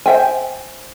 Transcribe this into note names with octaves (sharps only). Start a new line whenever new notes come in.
C5 E5 G5 G#5